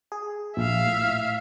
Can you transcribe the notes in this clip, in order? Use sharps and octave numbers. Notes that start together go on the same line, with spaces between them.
G#4
A#1 E5 F5
A2